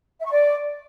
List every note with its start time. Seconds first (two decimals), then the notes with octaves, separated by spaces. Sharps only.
0.19 E5
0.25 C#6
0.31 D5